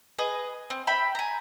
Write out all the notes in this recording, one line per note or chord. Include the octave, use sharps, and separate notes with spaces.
G#4 B4 D#5
C4
E5 G5 B5
G#5 A#5